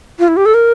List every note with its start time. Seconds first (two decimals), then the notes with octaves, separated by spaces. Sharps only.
0.19 F4
0.28 E4
0.37 G4
0.46 A4
0.54 A#4